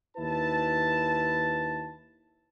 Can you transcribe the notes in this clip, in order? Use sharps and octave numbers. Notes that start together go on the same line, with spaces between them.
D#2 E4 B4 A5